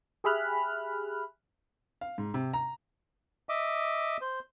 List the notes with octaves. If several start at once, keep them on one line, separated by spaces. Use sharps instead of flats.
G4 G#4 E5 B5 F6 F#6
F5
G#2
C3
A#5
D#5 E5 D6
C5